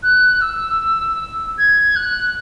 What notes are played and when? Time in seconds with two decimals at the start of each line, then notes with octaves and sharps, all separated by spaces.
0.03 F#6
0.41 E6
1.58 G#6
1.96 F#6